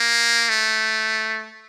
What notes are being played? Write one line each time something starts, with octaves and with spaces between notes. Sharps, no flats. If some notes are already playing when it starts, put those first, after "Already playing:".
Already playing: A#3
A3